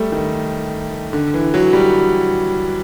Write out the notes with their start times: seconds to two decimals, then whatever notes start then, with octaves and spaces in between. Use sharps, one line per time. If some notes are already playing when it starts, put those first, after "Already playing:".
Already playing: G3 A3
0.12 D#3
1.13 D3
1.34 E3
1.54 F#3
1.73 G3